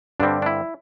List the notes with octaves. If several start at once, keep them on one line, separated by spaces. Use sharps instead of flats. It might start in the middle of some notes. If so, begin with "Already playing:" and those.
G2 D3 G3 C4 D4
D4
E4